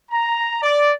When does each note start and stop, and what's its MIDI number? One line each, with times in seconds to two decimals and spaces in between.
0.11 0.59 82
0.62 0.92 74